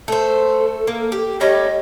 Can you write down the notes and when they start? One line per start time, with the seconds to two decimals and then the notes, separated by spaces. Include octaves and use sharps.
0.08 A3 A4 C5
0.87 A#3
1.12 G4
1.41 G3 A3 C#4 D#5